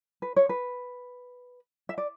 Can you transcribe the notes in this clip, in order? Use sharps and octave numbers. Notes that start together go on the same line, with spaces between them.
B4
C#5
B4
E5
D5